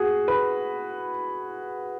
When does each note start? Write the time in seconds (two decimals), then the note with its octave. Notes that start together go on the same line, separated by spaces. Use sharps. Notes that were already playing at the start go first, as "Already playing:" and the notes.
Already playing: F#4 G#4
0.28 B4